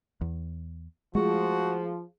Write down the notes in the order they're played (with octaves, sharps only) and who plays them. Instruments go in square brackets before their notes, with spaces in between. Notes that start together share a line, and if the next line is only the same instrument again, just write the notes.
[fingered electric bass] E2
[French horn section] F3 [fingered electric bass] G#3 A3 [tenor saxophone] F#4 [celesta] G#4